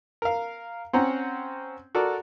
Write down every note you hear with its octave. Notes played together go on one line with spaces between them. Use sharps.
A#4 F5
C4 C#4 F#5 A#5
F#4 A4 A#4 D5